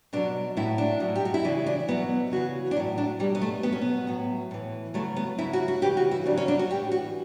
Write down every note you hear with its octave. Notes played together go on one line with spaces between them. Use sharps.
B2 F#3 D4
A2 F#3 E4
D4
B2 F#3
G4
F#4
E4
C#3 E3 D4
D4
B2 F#3 B3
C#3 E3 F#4
D4
A2 F#3 E4
D4
B2 F#3 G3
B3
A3
B2 F#3 B3
C#4
B3
A2 F#3
A2 E3
C#3 F#3 A3
B3
C#3 F#3 E4
F#4
F#4
C#3 E3 G4
F#4
E4
C#3 D4
F#3
C#4
D4
F#4
A2 E3 G4
F#4